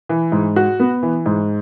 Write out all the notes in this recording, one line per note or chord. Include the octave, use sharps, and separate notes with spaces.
E3
G#2
F#4
B3
E3
G#2